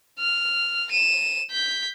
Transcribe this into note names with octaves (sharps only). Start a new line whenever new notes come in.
F6
D#7 E7
G6 B6